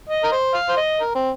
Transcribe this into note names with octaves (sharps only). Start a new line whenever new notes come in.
D#5
A#4
C5
F5
C5
D#5
A#4
C4